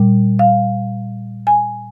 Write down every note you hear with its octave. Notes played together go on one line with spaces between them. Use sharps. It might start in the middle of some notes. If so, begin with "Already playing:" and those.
Already playing: A#2 G3
F5
G#5